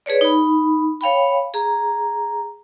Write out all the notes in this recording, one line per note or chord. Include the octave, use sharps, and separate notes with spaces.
G#4 B4 C#5 D5
D#4 B5
C#5 F5 G5 B5
G#4 A#5